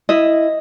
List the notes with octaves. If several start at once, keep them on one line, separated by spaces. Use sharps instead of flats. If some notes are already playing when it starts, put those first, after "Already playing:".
E4 D#5